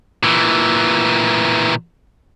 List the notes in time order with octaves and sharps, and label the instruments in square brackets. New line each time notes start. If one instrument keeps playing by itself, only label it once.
[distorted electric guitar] A#2 E3